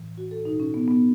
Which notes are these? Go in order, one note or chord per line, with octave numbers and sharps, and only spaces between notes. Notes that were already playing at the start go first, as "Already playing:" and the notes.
Already playing: A2 E3
F#4
A4
B2 D#4
C#4
B3
B3